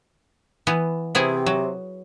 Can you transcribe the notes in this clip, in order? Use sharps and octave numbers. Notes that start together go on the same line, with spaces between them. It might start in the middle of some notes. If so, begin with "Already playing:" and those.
E3 B3
C3 B3 E4 G#4
F#3